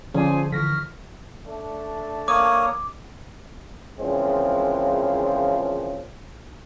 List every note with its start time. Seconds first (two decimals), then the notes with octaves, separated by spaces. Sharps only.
0.14 D3 F3 C#4 G#4 C5 D5 G#5
0.52 D3 E3 C#6 F6 A#6 B6
1.46 A3 D4 A4
2.28 A#3 C#5 D6 D#6
3.99 A#2 C#3 E3 F3 G#3 C4